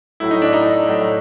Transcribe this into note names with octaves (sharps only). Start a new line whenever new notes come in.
A2 F#3 A3 E4
D#4
D4
D#4
A2 F#3 A3